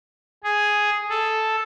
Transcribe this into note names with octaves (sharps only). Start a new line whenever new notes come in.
G#4
A4